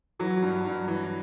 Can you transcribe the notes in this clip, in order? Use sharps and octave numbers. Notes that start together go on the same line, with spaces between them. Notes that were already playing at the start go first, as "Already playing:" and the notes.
E3 F#3
G2
G2
E3